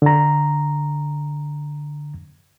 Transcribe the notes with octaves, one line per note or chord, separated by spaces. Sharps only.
D3 A#5